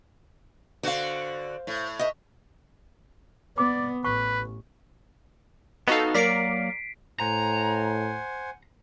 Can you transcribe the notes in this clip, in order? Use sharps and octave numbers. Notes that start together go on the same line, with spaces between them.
D3 F#4 C5 F5
A2
D#5 E5
B3 D5 D6
A1 B4 C#6
B3 D#4 F#4 A4 F5
F#3 A#3 A#4 D5 B6 C7 D7
A2 C5 F#5 G#5 A#5